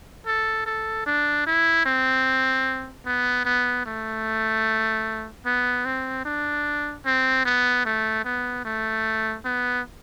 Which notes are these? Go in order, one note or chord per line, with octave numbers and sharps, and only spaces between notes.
A4
A4
D4
E4
C4
B3
B3
A3
B3
C4
D4
C4
B3
A3
B3
A3
B3